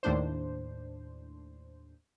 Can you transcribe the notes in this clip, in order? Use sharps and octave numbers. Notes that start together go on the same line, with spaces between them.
D#2 A2 D4 C5